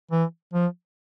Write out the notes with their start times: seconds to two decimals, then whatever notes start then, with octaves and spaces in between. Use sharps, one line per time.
0.12 E3
0.54 F3